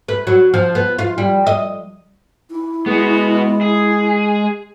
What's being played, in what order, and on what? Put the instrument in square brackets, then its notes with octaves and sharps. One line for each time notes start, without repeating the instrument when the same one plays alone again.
[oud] B4
F#3
F3
B3
F4
G3
D#5
[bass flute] E4
[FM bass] G#3 [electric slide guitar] B3 F#4
[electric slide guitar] G#4